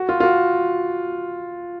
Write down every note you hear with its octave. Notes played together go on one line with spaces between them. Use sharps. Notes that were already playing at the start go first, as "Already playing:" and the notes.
Already playing: F#4
F4
F4
F#4